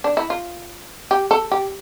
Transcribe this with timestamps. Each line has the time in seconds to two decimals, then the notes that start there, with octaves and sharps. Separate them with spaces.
0.04 D4
0.17 E4
0.30 F4
1.11 G4
1.31 A4
1.52 G4